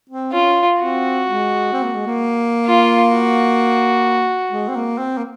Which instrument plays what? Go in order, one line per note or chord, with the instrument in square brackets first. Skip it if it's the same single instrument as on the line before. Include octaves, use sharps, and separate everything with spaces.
[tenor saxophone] C4
[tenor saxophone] C#4 [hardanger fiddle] F4
[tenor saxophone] C4 [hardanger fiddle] F#4
[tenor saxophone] G#3
C4
A#3
G#3
A#3
[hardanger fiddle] F4
F#4
[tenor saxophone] G#3
C4
A#3
C4
A#3